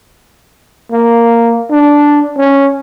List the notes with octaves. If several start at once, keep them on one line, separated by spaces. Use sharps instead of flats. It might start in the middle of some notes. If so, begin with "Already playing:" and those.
A#3
D4
C#4